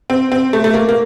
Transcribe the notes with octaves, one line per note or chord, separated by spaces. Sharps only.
C4
C4
A3
A3
A#3
A#3